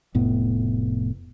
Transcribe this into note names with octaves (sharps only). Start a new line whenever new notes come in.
F1 A2 B3